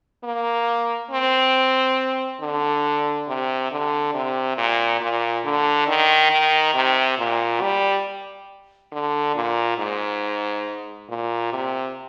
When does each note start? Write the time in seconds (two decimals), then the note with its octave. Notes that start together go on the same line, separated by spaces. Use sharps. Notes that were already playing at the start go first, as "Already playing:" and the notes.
0.24 A#3
1.11 C4
2.41 D3
3.28 C3
3.71 D3
4.14 C3
4.58 A#2
5.01 A#2
5.45 D3
5.88 D#3
6.31 D#3
6.74 C3
7.19 A#2
7.61 G3
8.92 D3
9.35 A#2
9.78 G#2
11.09 A#2
11.53 C3